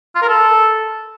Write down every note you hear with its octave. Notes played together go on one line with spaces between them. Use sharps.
F4
A#4
A4